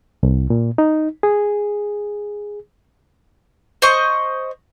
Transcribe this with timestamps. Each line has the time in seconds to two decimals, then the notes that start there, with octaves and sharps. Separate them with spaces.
0.23 C2
0.50 A#2
0.78 D#4
1.23 G#4
3.82 C5 D#5 C#6